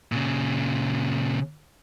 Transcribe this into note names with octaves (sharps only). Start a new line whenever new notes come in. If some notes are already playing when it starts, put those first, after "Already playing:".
A#2 C#3